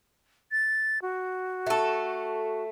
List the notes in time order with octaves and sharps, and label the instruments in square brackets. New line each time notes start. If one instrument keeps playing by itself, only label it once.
[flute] A6
F#4
[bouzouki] A3 A4